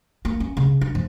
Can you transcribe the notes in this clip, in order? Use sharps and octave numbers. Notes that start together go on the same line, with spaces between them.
A#3
C#4
C#3
D#4
F3